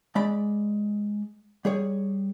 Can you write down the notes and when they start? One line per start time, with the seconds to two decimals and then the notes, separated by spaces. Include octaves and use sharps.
0.16 G#3 D5 B5
1.65 G3 G#4 C#5